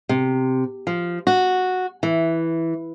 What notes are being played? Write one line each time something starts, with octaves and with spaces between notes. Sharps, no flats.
C3
F3
F#4
E3